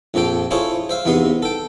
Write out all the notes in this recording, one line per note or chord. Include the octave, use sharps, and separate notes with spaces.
A#1 F2 F3 A4 G5
E4 F4 G#4 A4 C5 C#5
C5 E5 F5
E2 C3 B3 D#4 C6
A4 G5